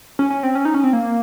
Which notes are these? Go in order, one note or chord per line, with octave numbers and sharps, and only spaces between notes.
C#4
C#4
C4
C#4
D#4
C#4
C4
A#3